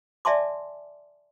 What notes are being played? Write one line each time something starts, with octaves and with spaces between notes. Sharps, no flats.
D5 E5 G#5 A5 C6 D6